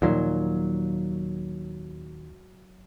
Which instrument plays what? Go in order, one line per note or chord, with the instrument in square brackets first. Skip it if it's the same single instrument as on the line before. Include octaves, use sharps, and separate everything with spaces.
[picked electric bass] D#2 A#2 [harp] F#3